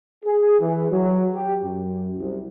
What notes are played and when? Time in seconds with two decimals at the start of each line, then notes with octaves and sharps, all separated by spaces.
0.25 G#4
0.60 E3
0.92 F#3
1.33 G4
1.63 F#2
2.18 C2